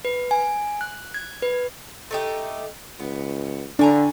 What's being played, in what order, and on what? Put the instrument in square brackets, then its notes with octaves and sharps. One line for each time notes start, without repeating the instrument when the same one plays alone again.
[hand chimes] B4
G#5
F#6
G#6
B4
[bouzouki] A3 D#4 G4
[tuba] C#2 [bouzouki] B3
[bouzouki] A2 G#5 A#5 [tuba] D3 [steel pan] D4